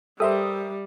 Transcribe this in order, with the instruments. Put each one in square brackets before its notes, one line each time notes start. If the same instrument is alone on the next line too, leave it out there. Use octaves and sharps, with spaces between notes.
[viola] G3 [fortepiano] G4 A#4 C5 [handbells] A4 [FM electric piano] E5 D#6